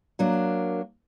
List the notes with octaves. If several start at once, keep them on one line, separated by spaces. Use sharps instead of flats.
F#3 A#3 D4